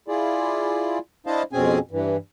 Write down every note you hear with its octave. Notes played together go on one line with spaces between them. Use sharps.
E4 F4 G#4 D5
D4 E4 C5 D#5 F5 A5
F2 B2 C4 C#4 G#4 G#5
G2 E3